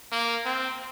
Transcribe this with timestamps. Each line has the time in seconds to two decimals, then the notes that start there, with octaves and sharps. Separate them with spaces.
0.12 A#3
0.45 C4